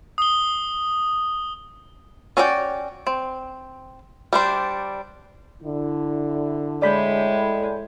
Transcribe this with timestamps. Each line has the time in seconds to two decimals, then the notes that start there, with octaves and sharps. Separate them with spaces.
0.18 D#6 G7
2.37 C#4 D4 F#4 D5 G5
3.07 C4
4.33 G3 D4 C5
5.63 D3 E4
6.82 A2 G#3 D5 B5 G6